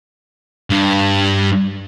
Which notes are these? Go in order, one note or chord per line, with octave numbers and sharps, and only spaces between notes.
G2